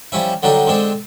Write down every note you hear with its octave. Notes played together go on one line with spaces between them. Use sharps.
F3 G3 C#4 E4
D3 F#3 G3 D4 D#4
D3 G#3 C4 D4